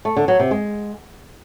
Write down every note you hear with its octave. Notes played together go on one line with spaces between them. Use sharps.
A3
D3
F#3
C3
G#3